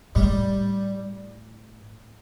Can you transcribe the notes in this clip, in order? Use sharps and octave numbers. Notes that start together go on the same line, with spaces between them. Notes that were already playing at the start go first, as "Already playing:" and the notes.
A2 G3